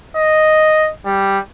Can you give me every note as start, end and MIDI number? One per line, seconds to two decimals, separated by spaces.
0.16 0.90 75
1.06 1.38 55